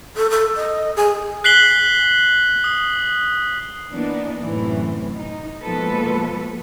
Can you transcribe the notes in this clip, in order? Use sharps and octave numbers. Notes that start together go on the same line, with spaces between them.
A4
A4
D#5
G#4
F#6 B6 C7 F#7 G7
D#6
E3 A#3 B3 D4 D#4
F#2 A2 C3 E3
D#4
B2 F3 G#3 A#3 A4 B4